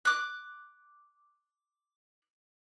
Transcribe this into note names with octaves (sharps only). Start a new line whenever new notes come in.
D6 F#6